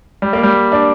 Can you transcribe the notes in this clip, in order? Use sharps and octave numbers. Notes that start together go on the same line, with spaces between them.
G3
A#3
G3
D4